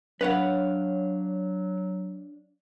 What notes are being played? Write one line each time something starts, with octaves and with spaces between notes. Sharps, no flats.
F#3 D4 B4 C#5 F5 F#5